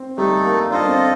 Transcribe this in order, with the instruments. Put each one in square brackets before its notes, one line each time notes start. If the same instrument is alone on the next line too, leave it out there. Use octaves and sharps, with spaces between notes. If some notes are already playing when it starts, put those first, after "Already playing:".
Already playing: [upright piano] C4
[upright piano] G3 [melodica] A3 D#4 A4
[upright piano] A#3
[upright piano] D4 [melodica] F4 A4 C5 D#5
[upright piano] C4